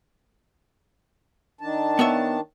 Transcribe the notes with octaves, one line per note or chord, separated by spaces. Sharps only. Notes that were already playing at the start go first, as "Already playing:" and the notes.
D#3 D4 A5
B3 C#5 E5